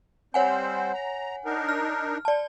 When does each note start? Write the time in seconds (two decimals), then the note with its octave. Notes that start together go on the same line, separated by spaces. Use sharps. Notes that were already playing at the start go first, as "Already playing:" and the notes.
0.34 G3 C4 C5 C#5 F#5 G#5
0.94 A#5
1.45 D4 D#4 A#4
1.69 F6
2.25 D5 A5